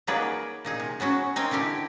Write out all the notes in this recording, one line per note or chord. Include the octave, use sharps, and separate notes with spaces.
F#3 A#3 D#4 G#4 B4 D5
A#2 D#4 G#4
C3
F#3 B3 C#4 F#4
C4 D#4 A#4 G5 G#5
D3 D#4 E4 G4